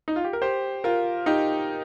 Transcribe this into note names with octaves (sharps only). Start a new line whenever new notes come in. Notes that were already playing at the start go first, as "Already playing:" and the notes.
D#4
F4
G4
A#4
G4 C5
F4 A#4
D#4 G4